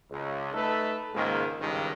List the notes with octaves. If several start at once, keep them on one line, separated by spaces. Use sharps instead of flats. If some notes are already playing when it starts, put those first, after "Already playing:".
C#2
A3 D#4 A4 B4
C#2 G#2 D#3 A#3
G#1 C#2 G2 D#3